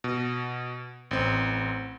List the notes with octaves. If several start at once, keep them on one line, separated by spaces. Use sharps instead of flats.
B2
A1 C4